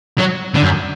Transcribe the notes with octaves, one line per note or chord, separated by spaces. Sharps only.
F#3
D3
F#2